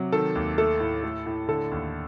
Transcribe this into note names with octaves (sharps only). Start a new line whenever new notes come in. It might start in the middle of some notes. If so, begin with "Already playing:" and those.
Already playing: C3 F#3
D#3 A4
D#2
A3 A4
A2
A3
A2
D3 A4
D#2